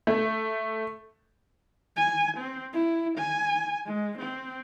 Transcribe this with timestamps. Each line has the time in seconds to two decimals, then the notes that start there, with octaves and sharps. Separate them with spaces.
0.07 A3
1.96 G#5
2.37 C4
2.73 E4
3.18 G#5
3.86 G#3
4.18 C4